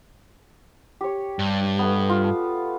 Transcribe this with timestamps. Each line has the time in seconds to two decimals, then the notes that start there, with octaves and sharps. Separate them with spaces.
1.01 G4 C#5
1.39 G2
1.79 A3 B3
2.10 F4
2.24 A4